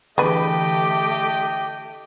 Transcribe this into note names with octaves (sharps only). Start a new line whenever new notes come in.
D3 E3 A3 G4 G#4 B4 D#5 G5